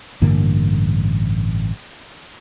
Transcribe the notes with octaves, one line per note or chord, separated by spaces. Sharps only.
A1 G2 D3 A#3